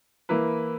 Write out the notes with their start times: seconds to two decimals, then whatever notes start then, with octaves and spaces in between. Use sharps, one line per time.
0.29 E3 A#3 E4 B4